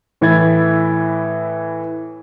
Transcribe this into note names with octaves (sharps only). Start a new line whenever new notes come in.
A2 E3 E4 E5 G#6 A6